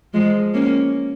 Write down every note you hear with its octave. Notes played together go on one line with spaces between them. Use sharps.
F3 G#3
A#3 C#4